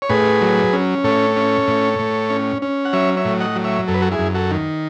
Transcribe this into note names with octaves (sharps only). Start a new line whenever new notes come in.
C#5
A2 G#4 B4
F#3
C#4
A2 A4 C#5
C#4
A2
A2
C#4
C#4
F#5
F#3 C#5 E5
C#5 E5
A2
D#5 F#5
F#3
C#5 E5
F#2 A4
B4
F#4 A4
E4 G#4
F#2
F#4 A4
D#3